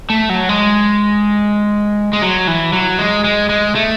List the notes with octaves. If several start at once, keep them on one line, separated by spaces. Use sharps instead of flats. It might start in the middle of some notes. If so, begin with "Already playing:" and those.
A3
F#3
G#3
G#3
F#3
E3
F#3
G#3
G#3
G#3
A3